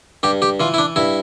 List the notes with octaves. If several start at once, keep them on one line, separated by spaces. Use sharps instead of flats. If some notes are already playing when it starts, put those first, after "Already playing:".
G2 G4
G4
E3 F4
E4
D4
G2 E4